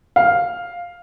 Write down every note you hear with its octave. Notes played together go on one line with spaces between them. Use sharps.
F5